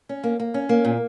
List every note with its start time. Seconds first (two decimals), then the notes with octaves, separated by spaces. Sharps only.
0.09 C#4
0.24 A#3
0.40 A#3
0.54 C#4
0.69 A#3
0.85 A#2